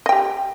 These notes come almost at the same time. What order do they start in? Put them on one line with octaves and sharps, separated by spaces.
D#5 G5 G4